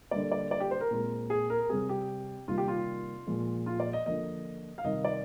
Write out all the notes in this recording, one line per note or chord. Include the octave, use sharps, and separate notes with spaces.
D3 G3 A#3 D5
D5
D5
G4
C5
A#4
A#2 G#3 C4
G#4
A#4
C3 G3 C4 G#4
G4
C3 D#3 G3 A#3 F4
G4
F4
A#2 F3 G#3
F4
D5
D#5
D3 F3 A#3 D#5
F5
C3 D#3 G3 D#5
D5